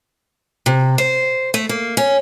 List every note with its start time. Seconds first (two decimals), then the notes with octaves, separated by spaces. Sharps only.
0.66 C3
0.98 C5
1.54 A3
1.69 A#3
1.97 C#4